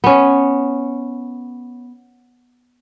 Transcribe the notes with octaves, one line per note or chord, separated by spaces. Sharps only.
B3 C#4